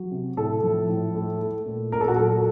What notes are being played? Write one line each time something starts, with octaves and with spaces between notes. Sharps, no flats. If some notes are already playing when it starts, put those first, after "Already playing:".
Already playing: F#3
C3
A2 A4
F3
A2
A3
A3
A#2
A#2 A#4
A4
F#4
F#3 A4